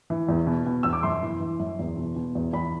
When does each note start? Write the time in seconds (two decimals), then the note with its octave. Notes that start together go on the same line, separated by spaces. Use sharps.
0.10 E3
0.29 E2
0.47 B2
0.66 B2
0.83 E2 E6
0.93 D6
1.03 F#2 C6
1.22 E3
1.40 E3
1.59 F#2
1.79 E2
1.97 B2
2.16 B2
2.35 E2
2.53 E2 B5